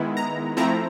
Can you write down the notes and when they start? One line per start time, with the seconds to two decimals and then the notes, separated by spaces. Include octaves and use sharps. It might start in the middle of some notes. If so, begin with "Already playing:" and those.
Already playing: D#3 G#3 B3 E4
0.17 A#5
0.57 F3 A3 C4 E4 A#5